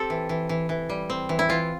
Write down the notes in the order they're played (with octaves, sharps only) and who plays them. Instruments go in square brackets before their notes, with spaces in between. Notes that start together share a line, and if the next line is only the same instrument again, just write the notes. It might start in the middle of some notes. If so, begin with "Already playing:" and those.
Already playing: [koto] C4 G4 A4
E3
E3
E3
E3
G3
C4
E3
E4
E3 F4